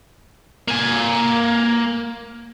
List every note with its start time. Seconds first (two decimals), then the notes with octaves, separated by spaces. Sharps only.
0.68 A#3 G#5